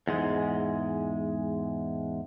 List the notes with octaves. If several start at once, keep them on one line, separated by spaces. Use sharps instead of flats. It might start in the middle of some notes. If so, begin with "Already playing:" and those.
E2 G#2 G#3